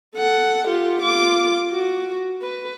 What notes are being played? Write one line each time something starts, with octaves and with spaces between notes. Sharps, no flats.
A4 F#5
F4 G4
F4 D6
F#4
B4